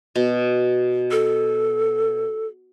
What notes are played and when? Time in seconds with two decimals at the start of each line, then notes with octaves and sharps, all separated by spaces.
0.16 B2
1.11 A4